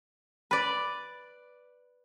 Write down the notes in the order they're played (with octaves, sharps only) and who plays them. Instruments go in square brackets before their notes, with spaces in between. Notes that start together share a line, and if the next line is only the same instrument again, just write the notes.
[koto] B4 D5